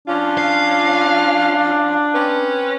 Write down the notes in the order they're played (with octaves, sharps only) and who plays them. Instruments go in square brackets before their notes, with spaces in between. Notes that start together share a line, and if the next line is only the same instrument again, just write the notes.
[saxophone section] F3 C#4 F4 [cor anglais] D4
[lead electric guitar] F5
[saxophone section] C4 C#4 B4